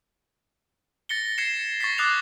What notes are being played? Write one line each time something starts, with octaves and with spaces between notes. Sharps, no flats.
A6 A#6 C#7 G7
G#6 C7 C#7 E7
C#6 A6 B6 C7
D6 D#6 F#6 G#6 C7 F7